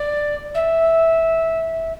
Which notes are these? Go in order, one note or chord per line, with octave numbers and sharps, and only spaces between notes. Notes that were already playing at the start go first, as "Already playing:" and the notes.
Already playing: D5
E5